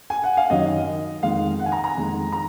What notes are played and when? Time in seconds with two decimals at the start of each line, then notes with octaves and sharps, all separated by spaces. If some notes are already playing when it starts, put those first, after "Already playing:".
0.10 G#5
0.24 F#5
0.37 F5
0.50 F#2 D#3 F#3 D#5
1.23 F2 D#3 G#3 F5
1.60 F#5
1.66 G#5
1.72 A#5
1.84 A#5
1.97 F2 D#3 G#3
2.32 A#5